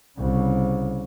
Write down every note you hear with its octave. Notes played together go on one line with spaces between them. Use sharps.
C2 C#3